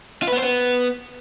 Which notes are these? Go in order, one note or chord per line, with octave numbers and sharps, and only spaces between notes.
F4
B4
B3
C5
B3